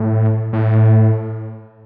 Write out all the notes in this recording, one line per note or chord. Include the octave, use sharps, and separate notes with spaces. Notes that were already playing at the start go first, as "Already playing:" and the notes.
Already playing: A2
A2